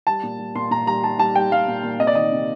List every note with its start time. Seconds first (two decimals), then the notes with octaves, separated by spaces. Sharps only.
0.07 G3 A5
0.23 A#2
0.39 G3
0.55 A#2 C6
0.71 A#2 A#5
0.87 G3 A#5
1.04 G3 A5
1.19 G3 A5
1.36 G3 G5
1.51 G3 F5
1.68 A#2
1.83 A#2
1.99 C3 D#5
2.07 D5
2.15 D#3 D#5
2.32 C3